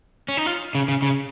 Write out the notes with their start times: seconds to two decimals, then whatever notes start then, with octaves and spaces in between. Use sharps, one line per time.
0.28 C#4
0.37 D#4
0.46 F4
0.75 C#3
0.88 C#3
1.02 C#3